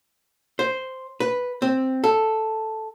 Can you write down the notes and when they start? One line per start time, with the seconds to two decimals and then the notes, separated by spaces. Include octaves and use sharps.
0.59 C5
1.20 B4
1.62 C4
2.04 A4